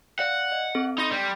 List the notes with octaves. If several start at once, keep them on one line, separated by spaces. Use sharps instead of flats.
D5 F5 F#5
D#5
C4 A4
D#4 B5 C6 A#6
G3